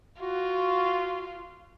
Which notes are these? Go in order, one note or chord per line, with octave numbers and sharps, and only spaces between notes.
F4 F#4